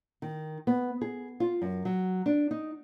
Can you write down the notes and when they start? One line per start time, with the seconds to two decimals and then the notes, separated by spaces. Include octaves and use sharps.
0.22 D#3
0.67 B3
1.01 G#4
1.40 F4
1.62 F#2
1.85 F#3
2.26 D4
2.51 D#4